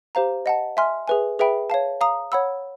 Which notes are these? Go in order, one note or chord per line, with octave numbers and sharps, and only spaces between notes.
G4 C5 F5 A#5
D#5 F#5 A5
E5 G#5 C6 F6
G#4 B4 E5 G#5
G#4 B4 E5 G5 B5
C#5 F5 A5
F5 A#5 D#6
C#5 F#5 B5 E6